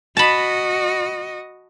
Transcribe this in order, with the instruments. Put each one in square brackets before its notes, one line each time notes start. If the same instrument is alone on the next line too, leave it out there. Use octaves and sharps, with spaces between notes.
[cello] F#4 D#5 [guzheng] A5 B5